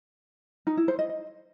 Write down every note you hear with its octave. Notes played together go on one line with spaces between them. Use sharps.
D#4
E4
C5
D#5
D#5